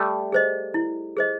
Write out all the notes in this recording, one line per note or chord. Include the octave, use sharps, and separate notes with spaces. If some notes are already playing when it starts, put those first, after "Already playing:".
Already playing: G3 A3
G#4 C5 D#5
E4
G#4 C5 D#5